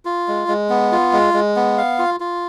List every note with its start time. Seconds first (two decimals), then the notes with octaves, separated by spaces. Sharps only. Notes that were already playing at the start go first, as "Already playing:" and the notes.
0.05 F4
0.28 G#3
0.48 G#3
0.70 B3
0.92 F4
1.13 G#3
1.34 G#3
1.56 B3
1.78 F5
1.99 F4
2.20 F4